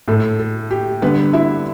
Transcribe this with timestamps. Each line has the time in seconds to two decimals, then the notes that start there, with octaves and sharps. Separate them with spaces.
0.08 A2 A3 A4
0.39 A4
0.71 G4
1.02 G2 D3 B3 B4
1.33 E4 E5